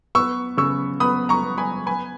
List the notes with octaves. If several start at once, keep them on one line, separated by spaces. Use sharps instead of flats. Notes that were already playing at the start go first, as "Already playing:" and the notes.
B3 C#6 E6
C#3 C#6 E6
B3 B5 D#6
A#5 C#6
B3
G#5 B5
B3 G#5 B5